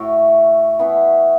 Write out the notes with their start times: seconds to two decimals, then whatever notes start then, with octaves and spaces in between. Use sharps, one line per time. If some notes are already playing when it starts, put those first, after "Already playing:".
Already playing: A2 A3 F#4
0.79 E3 B3 E4